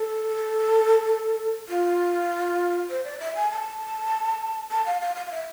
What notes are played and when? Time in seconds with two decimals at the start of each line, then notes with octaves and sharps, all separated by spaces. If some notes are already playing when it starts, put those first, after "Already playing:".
Already playing: A4
1.69 F4
2.90 C5
3.04 D5
3.20 E5
3.35 G#5
3.51 A5
4.71 A5
4.86 F5
5.01 F5
5.16 F5
5.26 F5
5.31 E5